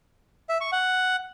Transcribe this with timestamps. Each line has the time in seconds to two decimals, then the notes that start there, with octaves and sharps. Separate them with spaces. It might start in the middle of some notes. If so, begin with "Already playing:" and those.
0.49 E5
0.61 C#6
0.72 F#5